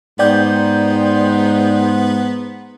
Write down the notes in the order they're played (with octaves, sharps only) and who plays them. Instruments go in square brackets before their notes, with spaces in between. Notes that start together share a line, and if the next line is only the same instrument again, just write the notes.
[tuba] G#2 [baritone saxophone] B3 [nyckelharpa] D#4 C6 [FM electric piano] D5 G5 G6